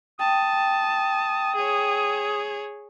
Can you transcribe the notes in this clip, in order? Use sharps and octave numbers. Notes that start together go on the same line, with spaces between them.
G5 A5 D#6
G#4 C#5